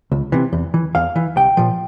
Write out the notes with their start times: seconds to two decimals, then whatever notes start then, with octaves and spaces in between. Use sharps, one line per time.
0.12 C#2
0.32 C3 E3
0.53 E2
0.74 E3
0.95 E2 F5
1.16 E3
1.37 C2 G5
1.57 A#2 F3